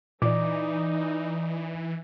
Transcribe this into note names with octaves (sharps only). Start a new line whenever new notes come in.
A#2 E3 D#4 D5 D6